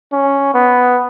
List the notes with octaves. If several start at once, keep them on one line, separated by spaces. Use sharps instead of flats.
C#4
B3